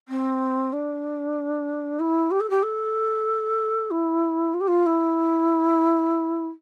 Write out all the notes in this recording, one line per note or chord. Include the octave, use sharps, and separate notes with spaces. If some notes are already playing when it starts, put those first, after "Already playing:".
C4
D4
E4
G4
A4
G4
A4
E4
F4
G4
F4
E4